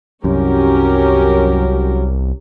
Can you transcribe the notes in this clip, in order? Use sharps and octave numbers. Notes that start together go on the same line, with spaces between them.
C2 F#2 F#3 C#4 G4 A#4